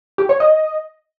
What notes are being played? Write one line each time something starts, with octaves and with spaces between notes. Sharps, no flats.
G4
C#5
D#5